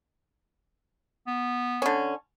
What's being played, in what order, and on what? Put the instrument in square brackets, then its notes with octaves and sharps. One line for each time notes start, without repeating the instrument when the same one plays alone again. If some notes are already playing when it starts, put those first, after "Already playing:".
[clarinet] B3
[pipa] D3 C#4